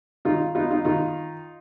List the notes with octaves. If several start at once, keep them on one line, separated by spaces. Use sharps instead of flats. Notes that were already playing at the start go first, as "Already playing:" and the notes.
D#3 D#4 F4
B3 D#4 F4
D#4 F4
D#3 D#4 F4